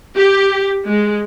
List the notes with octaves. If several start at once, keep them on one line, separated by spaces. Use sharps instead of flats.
G4
G#3